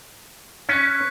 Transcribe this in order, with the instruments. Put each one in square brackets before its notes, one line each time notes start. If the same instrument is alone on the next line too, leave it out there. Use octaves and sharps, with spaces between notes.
[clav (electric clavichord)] C#4 [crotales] C#6 F#6 B6